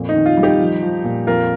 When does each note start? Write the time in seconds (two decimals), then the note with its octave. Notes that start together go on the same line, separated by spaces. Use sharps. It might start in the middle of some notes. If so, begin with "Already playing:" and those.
Already playing: F2 A#2
0.09 D#4
0.15 D#3
0.26 F4
0.37 G3
0.43 D#4 G4
0.60 F3
0.83 F3
1.04 A#2
1.27 F2 F4 A#4